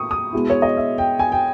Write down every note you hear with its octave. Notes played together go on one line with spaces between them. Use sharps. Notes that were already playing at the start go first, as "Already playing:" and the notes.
Already playing: A#2 C#6 D#6
D#6
B2 G#3 B3 E4
C#5
D#5
E5
G5
G#5
G5